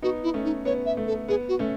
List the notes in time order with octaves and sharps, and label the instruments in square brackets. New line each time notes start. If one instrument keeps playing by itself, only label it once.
[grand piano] B3 D#4 [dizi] F#4
[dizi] E4
[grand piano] A3 C#4
[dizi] D#4
[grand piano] B3 [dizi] C#5
[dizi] E5
[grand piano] A3
[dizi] A4
[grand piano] B3 [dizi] G#4
[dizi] F#4
[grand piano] A3 C#4